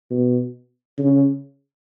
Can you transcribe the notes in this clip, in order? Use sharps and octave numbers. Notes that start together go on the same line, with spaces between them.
B2
C#3